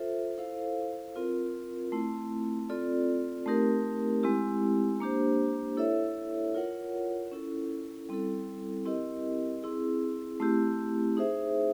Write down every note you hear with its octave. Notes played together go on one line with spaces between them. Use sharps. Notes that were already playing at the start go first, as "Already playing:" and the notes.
Already playing: F4 A4 C5 E5
E4 A4 C5 F5
C4 F4 A#4
A3 C4 E4
C4 F4 A4 D5
A3 C4 D#4 G4 A#4
G#3 C4 E4 G4
A#3 D4 G4 C5
E4 A4 C#5 E5
F4 A#4 C#5 F#5
C#4 E4 A4
G3 C4 E4 A4
C4 E4 G4 A#4 D#5
C4 E4 G#4
A3 C4 E4 G4
D#4 G#4 C5 E5